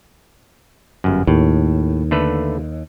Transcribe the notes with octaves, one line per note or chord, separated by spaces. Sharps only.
G1 F#2
D#2 A2
D3 A3 B4